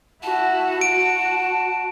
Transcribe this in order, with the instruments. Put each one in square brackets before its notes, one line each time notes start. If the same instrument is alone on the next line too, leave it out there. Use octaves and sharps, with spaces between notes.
[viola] E4 F#4 [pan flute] A5
[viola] F#4 [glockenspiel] D7